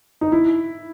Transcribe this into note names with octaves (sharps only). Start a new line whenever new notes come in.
D#4
E4